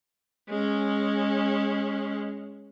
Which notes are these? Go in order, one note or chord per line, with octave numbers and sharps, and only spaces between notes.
G#3 C#4